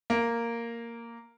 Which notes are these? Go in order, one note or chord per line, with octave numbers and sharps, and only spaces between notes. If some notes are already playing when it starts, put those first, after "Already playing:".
A#3